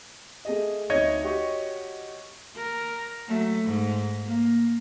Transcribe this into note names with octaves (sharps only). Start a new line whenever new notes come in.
A3 G#4 D#5
D2 D#4 C#5 D#5 G#6
F#4 G4 C#6
A#4
F#3 A3
G#2
A#3